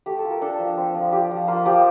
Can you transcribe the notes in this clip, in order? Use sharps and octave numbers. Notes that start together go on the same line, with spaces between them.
A3 G4
A4
F4
A#4
D4 A4
F3
C4
F3
F4 G4
F3
A#3 F4
F3 G4